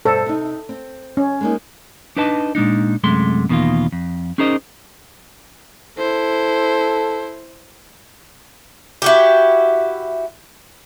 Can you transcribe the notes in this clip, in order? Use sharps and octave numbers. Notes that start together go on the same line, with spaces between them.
G2 B2 A4 C5
C3 D#4
C4
C#4
G#3 A#3 D#4
D4 D#4 B4 D#5 A5
A#2 G#3 D4 D#4
F#2 C3 G#3 A3 C6
E2 B2 D#3 G#3 A#3 F4
F2
C#4 D#4 G#4 A#4 C5 D#5
E4 A4 C5
E4 F#4 G4